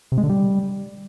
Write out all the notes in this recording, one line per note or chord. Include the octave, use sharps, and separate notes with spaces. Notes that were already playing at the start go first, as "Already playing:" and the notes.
C3
G#3
D3
G3